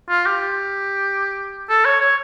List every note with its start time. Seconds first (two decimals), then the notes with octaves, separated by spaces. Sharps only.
0.09 F4
0.26 G4
1.69 A4
1.85 C#5
2.01 C#5